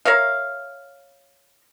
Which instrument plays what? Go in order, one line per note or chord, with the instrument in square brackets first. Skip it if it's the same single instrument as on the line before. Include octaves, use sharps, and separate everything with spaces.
[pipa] A#4 C#5 E5 F5